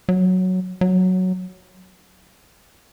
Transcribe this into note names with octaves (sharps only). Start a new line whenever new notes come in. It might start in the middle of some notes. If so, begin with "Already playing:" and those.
F#3
F#3